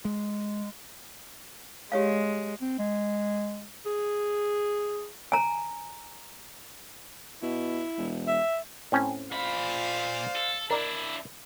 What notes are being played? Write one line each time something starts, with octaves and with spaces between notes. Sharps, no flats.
G#3
G#3 G4 C#5 F5
C4
G#3
G#4
G#5 A#5
B2 E4
E1
E5
A2 C4 C#4
A#2 C5 D5 F5 B5
A4
D4 E4 A#4 D5